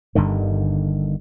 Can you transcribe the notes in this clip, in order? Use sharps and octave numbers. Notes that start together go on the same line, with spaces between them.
G1 G2 D3 D#3